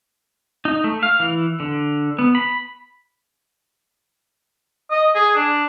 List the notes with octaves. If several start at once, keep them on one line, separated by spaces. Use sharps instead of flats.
D#4
A3
F5
E3
D3
B3
B5
D#5
G#4
D4